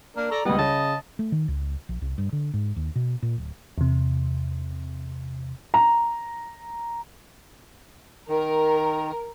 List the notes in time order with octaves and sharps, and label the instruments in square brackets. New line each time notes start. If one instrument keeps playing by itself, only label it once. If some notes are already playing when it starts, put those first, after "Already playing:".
[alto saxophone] A#3 [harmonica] D4 A#4
[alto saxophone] A4 [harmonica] D5 A#5 C#6
[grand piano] C#2 G3 [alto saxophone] B3 [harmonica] D#5
[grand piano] C#3 [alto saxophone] A5
[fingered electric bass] A3
D#3
C#2
A#1
C2
G2
D3
G#2
D#2
B2
A#2
D1
[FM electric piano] E2 C3
[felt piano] A#5
[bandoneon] D#3 [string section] A#4